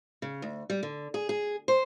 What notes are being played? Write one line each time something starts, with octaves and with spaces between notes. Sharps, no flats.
C#3
D2
G3
D3
G#4
G#4
C5